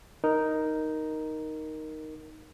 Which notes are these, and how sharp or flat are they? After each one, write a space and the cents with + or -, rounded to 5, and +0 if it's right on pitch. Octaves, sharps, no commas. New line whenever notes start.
D#4 +0 A#4 +0